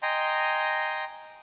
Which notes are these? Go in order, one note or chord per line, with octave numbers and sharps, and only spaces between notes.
D#5 G5 G#5 A#5 C6